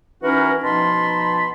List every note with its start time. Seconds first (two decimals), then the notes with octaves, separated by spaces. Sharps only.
0.23 E3 C#4 D#4 F#4 A#4 B4
0.63 B2 F3 D#4 A5 B5 C6